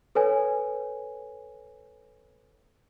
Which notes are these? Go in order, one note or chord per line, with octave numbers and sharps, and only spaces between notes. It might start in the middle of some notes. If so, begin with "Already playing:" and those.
A4 B4 C#5 G#5